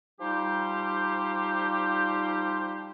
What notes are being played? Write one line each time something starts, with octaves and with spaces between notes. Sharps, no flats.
F3 G3 D#4 G4 C5